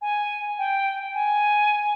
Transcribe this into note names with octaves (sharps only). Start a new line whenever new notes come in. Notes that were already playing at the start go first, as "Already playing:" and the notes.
G#5
G5
G#5